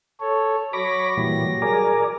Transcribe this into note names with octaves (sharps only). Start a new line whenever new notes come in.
A4 C#5
F#3 C#5 B5 D6 A#6
A#2 E3 G3
G#4 A#4 D5